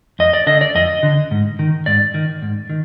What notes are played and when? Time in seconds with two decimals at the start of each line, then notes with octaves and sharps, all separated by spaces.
0.19 F2 D#5
0.33 D5
0.47 D3 D#5
0.61 D5
0.75 F2 D#5
1.03 D3
1.31 G#2
1.59 D#3
1.86 G#2 D5
2.14 D#3
2.42 G#2
2.70 D#3